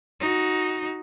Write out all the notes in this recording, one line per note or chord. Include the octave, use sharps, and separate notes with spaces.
D#4 F#4